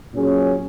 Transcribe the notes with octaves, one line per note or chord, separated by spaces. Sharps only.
A#2 F#3 C#4 G#4